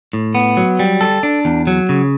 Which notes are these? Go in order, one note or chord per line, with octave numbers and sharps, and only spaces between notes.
A2
B3
F#3
G3
A4
D4
E2
F#3
C#3